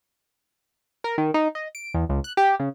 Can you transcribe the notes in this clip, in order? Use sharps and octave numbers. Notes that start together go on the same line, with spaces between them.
A#4
D#3
D#4
D#5
D7
E2
C#2
F#6
G4
C#3